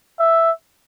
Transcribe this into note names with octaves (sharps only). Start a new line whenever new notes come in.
E5